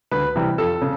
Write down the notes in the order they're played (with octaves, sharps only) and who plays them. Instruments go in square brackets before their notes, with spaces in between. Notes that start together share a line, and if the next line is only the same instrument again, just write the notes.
[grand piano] D2 B4
C3 E3 G3
F2 A4
C#3